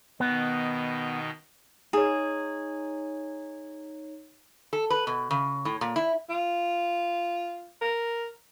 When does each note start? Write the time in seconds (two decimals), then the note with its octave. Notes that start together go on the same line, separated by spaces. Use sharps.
0.20 B2 D#3 B3 D#4
1.93 D#4 G#4 C#5
4.73 A4
4.90 B4
5.07 B2
5.31 C#3
5.65 A2
5.81 A#2
5.96 E4
6.30 F4
7.81 A#4